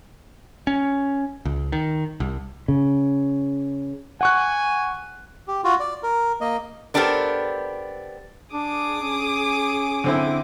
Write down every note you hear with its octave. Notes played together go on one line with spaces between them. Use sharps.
C#4
C#2
D#3
C2
C#3
F#5 G#5 C#6 F#6
G4
F4 F#4
D5
A#4
A#3 D#5
B3 D4 G4 A4 A#4 C5
D4 G#4 D6 D#6
C#4
D3 C4 E4